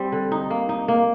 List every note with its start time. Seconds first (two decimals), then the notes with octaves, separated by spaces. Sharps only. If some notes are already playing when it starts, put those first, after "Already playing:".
Already playing: G3 C4
0.12 D3
0.32 D#4
0.50 A#3
0.69 D#4
0.88 A#3